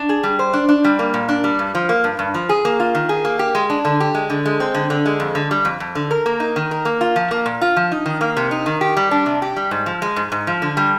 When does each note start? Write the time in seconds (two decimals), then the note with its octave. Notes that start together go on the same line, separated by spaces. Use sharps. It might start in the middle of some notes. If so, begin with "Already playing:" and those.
Already playing: D4
0.09 G#4
0.23 G3
0.39 C5
0.53 D4
0.69 D4
0.84 G3
0.99 A#3
1.14 A#2
1.29 D4
1.44 G3
1.59 G2
1.75 F3
1.89 A#3
2.04 G2
2.19 G2
2.34 F3
2.49 G#4
2.65 A#3
2.80 F4
2.95 D#3
3.09 G#4
3.25 A#3
3.39 G4
3.55 G#3
3.70 D4
3.85 D3
4.00 G4
4.14 G#3
4.30 D3
4.46 G#3
4.60 C4
4.74 D3
4.90 D3
5.06 G#3
5.20 F2
5.35 D3
5.51 G3
5.65 F2
5.80 F2
5.95 D3
6.11 A#4
6.26 A#3
6.40 D#4
6.56 D#3
6.71 A#4
6.85 A#3
7.01 F4
7.16 F3
7.31 A#3
7.46 A#2
7.61 F4
7.77 F3
7.92 D#4
8.06 D#3
8.21 A#3
8.37 C3
8.51 D#4
8.66 D#3
8.81 G4
8.97 G3
9.11 D4
9.26 C3
9.42 G4
9.56 G3
9.71 G#2
9.86 F3
10.02 G#3
10.16 G#2
10.32 G#2
10.47 F3
10.62 D3
10.77 G3